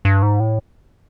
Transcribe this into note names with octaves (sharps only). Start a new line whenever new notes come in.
G2
G#2
A2